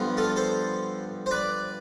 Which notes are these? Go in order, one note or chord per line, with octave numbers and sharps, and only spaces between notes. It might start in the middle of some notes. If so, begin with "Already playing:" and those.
Already playing: G2 D3 F3 B3
F4 A4
A4 C5
C5
B4 D5